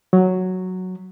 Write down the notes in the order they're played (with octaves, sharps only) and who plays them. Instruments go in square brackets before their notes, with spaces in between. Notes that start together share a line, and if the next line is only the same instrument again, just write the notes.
[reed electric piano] F#3